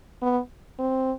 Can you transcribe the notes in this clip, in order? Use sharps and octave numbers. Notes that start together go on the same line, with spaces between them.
B3
C4